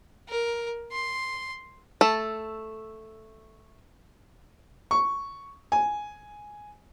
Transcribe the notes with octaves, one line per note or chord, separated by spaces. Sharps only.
A#4
C6
A3 A4
C#6
G#5